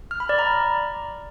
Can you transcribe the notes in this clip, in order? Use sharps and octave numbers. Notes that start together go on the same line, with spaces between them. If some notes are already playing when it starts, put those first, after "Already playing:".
F6
B5
D5
A#5